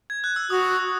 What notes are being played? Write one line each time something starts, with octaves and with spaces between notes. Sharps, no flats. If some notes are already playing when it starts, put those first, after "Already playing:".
G#6
F#6
E6
F#4 D#6